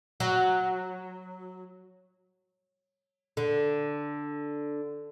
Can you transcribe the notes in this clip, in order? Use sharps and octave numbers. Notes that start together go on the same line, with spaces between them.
F#3
D3